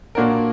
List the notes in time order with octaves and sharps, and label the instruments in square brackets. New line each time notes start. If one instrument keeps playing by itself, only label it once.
[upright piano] A#2 A#3 D4 F#4 A#4